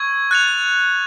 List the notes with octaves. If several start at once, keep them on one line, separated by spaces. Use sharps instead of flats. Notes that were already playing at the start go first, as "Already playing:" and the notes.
Already playing: C#6 E6 G#6
F#6 A6 C#7 F7